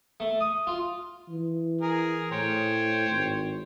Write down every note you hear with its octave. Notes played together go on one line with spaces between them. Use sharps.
A3
D#6
F4
E3
G#4 A#4
A2 C5 C#5 G5
G#1